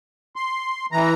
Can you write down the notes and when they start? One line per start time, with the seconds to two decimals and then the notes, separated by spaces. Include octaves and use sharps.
0.36 C6
0.92 E3 A#5